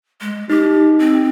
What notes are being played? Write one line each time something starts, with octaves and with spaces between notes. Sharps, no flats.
G#3
D#4 G4
C4